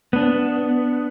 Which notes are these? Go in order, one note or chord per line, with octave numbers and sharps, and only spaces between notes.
B3 D4